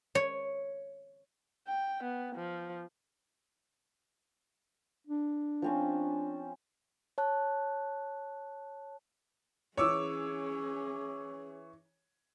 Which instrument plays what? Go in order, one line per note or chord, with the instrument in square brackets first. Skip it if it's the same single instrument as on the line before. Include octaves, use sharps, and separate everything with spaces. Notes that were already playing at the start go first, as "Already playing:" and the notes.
[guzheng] C#5
[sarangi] G5
B3
F3
[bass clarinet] D4
[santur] F3 C4 C#4
[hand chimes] C#5 A5 F#6
[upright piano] E3 C#5 [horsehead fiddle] C#4 G#4 [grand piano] C#6 D6 E6